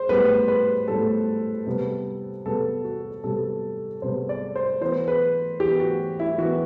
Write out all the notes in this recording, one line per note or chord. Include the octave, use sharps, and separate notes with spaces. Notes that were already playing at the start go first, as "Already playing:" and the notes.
Already playing: C5
A2 G3 B3 B4
B4
A2 G3 B3 A4
C3 G3 B3
C3 G3 B3 A4
F#4
C3 G3 B3 A4
C3 G3 B3 C5
D5
C5
E3 B3 C5
B4
E3 B3 G4
F#4
E4
E3 B3 F#4